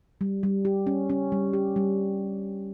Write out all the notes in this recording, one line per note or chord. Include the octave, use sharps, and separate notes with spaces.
G3
G3
G4
C#4
C#4
G3
G4
G3